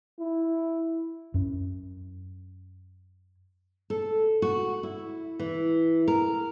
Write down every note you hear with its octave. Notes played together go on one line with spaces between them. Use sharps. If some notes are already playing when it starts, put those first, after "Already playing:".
E4
F#2 C#4
A4
F#4
E4
E3
A#4